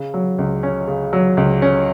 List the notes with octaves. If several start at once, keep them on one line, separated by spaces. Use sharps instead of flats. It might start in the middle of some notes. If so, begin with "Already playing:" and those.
Already playing: C#3
F#3
C#2
C#4
C#3
F#3
C#2
C#4